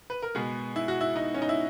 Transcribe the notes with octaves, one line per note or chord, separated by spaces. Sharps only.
B4
A#4
B2 G#3 B3 G#4
E4
F#4
E4
D#4
C#4
D#4
E4